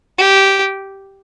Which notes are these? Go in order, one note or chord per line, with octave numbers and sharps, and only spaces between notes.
G4